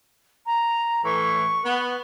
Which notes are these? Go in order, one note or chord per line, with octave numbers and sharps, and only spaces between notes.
A#5
A2 E3 C#6
B3 B4